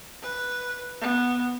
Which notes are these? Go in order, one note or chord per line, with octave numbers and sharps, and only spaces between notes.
B4
B3